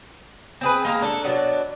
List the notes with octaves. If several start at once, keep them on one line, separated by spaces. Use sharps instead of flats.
C4 G#4 B4
G#3 A#3 A#4 A#5
D4 A4
B2 F#3 D4